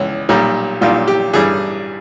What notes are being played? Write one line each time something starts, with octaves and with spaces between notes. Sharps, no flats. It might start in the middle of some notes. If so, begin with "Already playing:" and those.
Already playing: C#2 E3
B1 A#2 G3
B1 A#2 G3 F4
G4
A1 G2 E3 G3 G#4